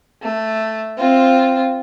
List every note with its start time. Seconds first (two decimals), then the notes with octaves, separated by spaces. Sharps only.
0.22 A3
0.98 C4 F4